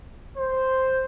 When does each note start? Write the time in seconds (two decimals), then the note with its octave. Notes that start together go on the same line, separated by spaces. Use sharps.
0.37 C5